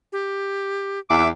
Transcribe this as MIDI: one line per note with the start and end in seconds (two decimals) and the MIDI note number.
0.12 0.99 67
1.10 1.30 40
1.10 1.28 76
1.10 1.27 86